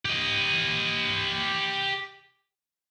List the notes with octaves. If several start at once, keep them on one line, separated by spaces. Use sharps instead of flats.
G4 D#5